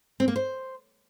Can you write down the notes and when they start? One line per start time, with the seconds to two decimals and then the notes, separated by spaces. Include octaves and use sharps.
0.20 C4
0.28 A#3
0.36 C5